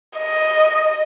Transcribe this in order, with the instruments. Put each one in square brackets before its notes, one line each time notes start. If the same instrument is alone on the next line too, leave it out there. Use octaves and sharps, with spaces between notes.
[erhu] D#5